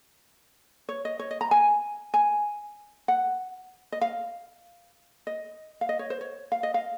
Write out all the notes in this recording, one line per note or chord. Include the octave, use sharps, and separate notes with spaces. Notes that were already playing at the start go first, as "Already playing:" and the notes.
C#5
D#5
C#5
D#5
A#5
G#5
G#5
F#5
D#5
F5
D#5
F5
D#5
C#5
C5
C#5
F5
D#5
F5